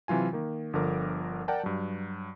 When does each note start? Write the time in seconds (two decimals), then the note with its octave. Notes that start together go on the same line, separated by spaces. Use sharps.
0.08 C3 E3 F#3 F4 G#5
0.33 D#3 A#3
0.73 G1 D3 F3 A#4 D6
1.48 A#4 D5 F#5 G5 A5
1.63 G2 F#3